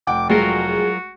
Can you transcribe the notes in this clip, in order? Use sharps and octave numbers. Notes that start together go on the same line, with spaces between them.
F1 F#5 G5 D6
F#3 G#3 F4 F#4 A#4